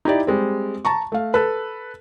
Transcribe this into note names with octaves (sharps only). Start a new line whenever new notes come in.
D#4 E4 G4 D5
G3 G#3 C4
A5 A#5 C#6
A3 F5
A4 B4